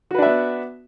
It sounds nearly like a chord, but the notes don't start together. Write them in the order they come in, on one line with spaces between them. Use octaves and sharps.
F#4 B4 D4 E5 B3